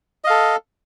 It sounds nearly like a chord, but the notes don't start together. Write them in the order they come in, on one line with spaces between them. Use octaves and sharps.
D#5 F5 A4